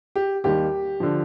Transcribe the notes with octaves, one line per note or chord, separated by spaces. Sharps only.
G4
D#2 D#3 G3 G4
D3 F3